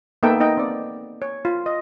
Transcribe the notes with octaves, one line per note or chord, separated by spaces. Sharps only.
A#3 B3 D#4 A4 E5 G5
D#4 D#5 G5
C4 D5
C#5
F4
D#5